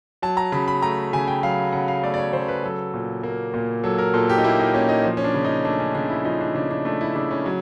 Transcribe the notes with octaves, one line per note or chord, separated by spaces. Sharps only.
F#3 A5
A#5
C#3 B5
B5
A3 A#5
C#3 G#5
G5
F#3 F5
C#3 F#5
F5
A3 D5
D5
C#5
C#3 C5
B4
F#3 A4
A#2
A#3
A#2
F#3 A4
A#4
A#2 A4
G4
D#4
A#3 E4
D#4
A#2 C#4
D#4
F3
C#4
D4
C#3
D#4
A3 D4
C#4
C#3 D4
E4
F3 D#4
D4
C#3 D4
D4
A3 D4
E4
C#3 D4
C#4
F#3